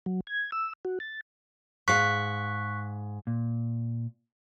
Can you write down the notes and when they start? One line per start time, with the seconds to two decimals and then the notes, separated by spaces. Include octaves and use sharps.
0.06 F#3
0.27 G#6
0.52 E6
0.85 F#4
1.00 A6
1.88 G#2 F5 C#6 F#6 B6
3.27 A#2